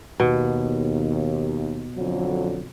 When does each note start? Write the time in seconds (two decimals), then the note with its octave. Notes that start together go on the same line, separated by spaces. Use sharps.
0.20 D#2 B2
1.95 F2 D3 F#3